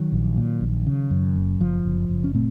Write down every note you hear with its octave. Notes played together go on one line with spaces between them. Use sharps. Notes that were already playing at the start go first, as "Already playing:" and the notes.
Already playing: D#3 F#3
A#1
A#2
A#1
C#3
F#2
F#1
F#1 F3
F#1
F#1
C#4
A#2 A3 C4